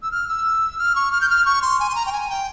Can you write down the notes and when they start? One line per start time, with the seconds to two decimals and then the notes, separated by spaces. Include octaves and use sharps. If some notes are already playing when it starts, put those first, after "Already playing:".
0.03 E6
0.11 F6
0.28 E6
0.79 F6
0.96 C#6
1.12 F6
1.21 G6
1.30 F6
1.45 C#6
1.62 C6
1.80 G#5
1.90 C6
1.95 A#5
2.06 G5
2.13 G#5
2.30 G5